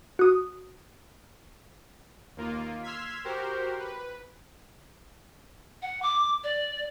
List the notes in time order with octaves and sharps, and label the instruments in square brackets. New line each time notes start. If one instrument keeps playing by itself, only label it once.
[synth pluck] F#4 D#6
[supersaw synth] D#2 A#3 F4
C6 E6 F6 G#6 B6
F#4 G4 A#4 C5
B4
[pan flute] F#5
D6
D5